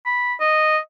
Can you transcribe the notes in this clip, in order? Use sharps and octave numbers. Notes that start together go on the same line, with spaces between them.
B5
D#5